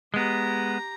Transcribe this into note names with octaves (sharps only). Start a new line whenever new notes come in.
G#3 B3 G4 A#5